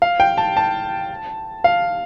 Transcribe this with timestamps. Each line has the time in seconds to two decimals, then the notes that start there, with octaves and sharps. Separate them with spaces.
0.02 F5
0.20 G5
0.38 A5
0.57 A5
1.64 F5